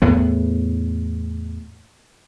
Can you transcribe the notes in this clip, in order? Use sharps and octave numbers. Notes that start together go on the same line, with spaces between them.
E2 A2 B3